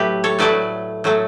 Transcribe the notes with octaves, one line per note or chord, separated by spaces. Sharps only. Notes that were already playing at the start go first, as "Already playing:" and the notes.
Already playing: A2 F#3 A3 G4 B4
A4 C#5
A2 F#3 A3 B4 D5
A2 F#3 A3